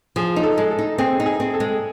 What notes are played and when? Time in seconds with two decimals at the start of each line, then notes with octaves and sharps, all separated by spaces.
0.16 F3 G#4
0.36 D#4
0.43 A4
0.58 G#3
0.71 A4
0.79 D#4
0.98 C4 G#4
1.20 D#4
1.26 G#4
1.40 C4
1.54 A4
1.60 G#3